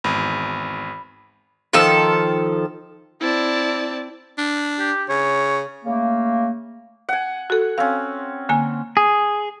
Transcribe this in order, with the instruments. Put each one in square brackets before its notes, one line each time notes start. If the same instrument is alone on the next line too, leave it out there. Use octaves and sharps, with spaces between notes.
[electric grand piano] G#1 E2 [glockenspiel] B5
[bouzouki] D#3 F3 A4
[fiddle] C4 D5 [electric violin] E4 A5
[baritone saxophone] D4
[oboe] G4
[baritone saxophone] C#3 [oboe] C#5
[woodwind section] C#3 A3 A#3
[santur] F#5 G#5
[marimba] F#4 A4
[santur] C4 C#4 [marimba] F5
[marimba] D3 A#3 G#5
[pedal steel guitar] G#4